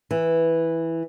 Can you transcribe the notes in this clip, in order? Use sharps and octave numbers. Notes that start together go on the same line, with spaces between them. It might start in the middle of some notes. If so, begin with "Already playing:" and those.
E3